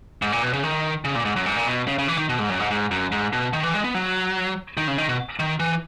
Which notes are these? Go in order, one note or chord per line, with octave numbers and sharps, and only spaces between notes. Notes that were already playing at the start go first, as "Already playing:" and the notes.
G#2
A#2
B2
C#3
D#3
C#3
A#2
G#2
F#2
G#2
A#2
B2
C#3
C#3
E3
D#3
B2
G#2
F#2
G#2
G#2
F#2
G#2
B2
D#3
E3
G#3
B3
F#3
D#3
C#3
D#3
B2
D#3
E3